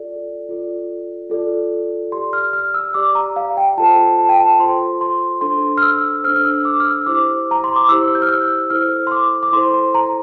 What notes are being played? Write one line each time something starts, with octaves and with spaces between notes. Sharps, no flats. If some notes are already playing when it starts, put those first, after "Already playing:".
Already playing: F4 A4 D5
F4 A4 D5
F4 A4 D5
G4 D5 C6
F6
F6
E6
G4 D5 D6
A#5
F5
G5
F4 A4 C5 A5
A5
G5
A5
F4 A4 C5 C6
C6
D4 A4 C5 C6
F6
E6
D4 A4 C5 F6
F6
E6
D6
F6
E6
E4 G4 C5 D6
A#5
C6
D6
E4 G4 C5 E6
G6
F6
E6
E4 A4 C5 F6
C6
D6
D6
E4 A4 C5 C6
C6
A#5